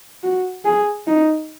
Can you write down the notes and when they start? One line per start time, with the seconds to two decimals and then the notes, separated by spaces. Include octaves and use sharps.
0.23 F#4
0.65 G#4
1.07 D#4